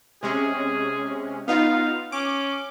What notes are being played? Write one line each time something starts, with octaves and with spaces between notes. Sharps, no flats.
C3 G#3 C#4 G#4
B3 D#4 F4 F5
C#4 D6